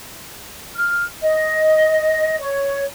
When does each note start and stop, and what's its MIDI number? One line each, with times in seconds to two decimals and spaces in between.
0.76 1.04 89
1.21 2.36 75
2.39 2.84 73